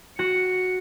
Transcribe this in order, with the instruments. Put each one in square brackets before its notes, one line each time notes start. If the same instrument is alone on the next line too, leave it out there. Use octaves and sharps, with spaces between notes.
[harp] F#4 [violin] C#7